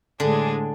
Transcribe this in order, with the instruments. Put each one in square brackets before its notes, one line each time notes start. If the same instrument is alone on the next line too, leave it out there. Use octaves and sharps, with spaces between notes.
[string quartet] A2 G#3 D4 G#4 [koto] D3